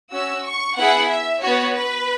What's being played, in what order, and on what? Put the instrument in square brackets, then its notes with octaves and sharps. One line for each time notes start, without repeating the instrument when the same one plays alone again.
[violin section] C#4 F#4 E6
C#6
B3 E4 G#4 F#5
E5
B3 F#4 C#5
B4